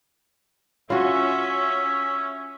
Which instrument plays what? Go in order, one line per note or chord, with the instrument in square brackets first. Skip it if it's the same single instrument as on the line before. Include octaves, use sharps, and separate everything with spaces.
[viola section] C#4 [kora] F4 F#4 [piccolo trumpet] E5